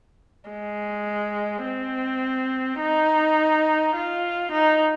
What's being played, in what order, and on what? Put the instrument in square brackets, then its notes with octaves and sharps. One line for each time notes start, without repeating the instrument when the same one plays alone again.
[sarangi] G#3
C4
D#4
F4
D#4